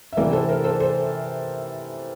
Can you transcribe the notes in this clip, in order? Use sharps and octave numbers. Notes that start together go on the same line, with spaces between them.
E5
C3 E3 A3 A#4 D5
A4 C5
A#4
A4 C5
A4 C5